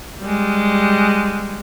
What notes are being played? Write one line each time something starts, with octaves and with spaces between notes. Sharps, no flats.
G3 G#3